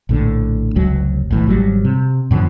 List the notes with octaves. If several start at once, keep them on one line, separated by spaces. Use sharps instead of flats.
A#1 A2 D3
F1 C#2 F#3
B1 A2 E3
G#1 F#3 G3
C3
F#2 B2 D3 F3